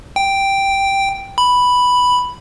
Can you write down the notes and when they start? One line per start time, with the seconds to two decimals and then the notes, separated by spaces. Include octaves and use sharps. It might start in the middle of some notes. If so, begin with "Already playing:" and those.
0.16 G5
1.38 B5